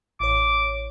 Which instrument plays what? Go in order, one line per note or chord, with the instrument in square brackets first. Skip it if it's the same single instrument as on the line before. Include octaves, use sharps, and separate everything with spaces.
[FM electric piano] A1 C#5 [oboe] D6